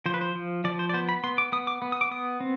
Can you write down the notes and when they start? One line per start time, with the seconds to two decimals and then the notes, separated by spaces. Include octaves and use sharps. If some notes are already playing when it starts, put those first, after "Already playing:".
0.06 F3 C5
0.14 B4
0.21 C5
0.35 F3
0.64 F3 D5
0.79 C5
0.89 D5
0.94 B3 C5
1.09 B5
1.24 B3 C6
1.38 D6
1.52 B3 D#6
1.67 D6
1.82 B3
1.92 D#6
2.01 D6
2.11 B3 D#6
2.40 C4